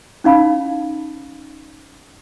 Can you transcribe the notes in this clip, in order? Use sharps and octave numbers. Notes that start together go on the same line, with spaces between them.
C#4 D#4 F5 B5